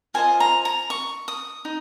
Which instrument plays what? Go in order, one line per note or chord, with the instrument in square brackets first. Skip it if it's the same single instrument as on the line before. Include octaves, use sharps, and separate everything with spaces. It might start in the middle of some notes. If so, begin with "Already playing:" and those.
[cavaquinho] F4 C5 D#5 G#5
A#5
A#5
C#6
D#6
D#4